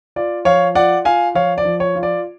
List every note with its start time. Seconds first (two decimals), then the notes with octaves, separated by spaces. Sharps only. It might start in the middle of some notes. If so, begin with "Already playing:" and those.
0.16 F4 D5
0.45 F3 C#5 F5
0.75 F4 D5 F#5
1.05 F4 F5 G#5
1.35 F3 C#5 F5
1.58 D5
1.65 F3
1.80 C#5
1.95 F4
2.03 D5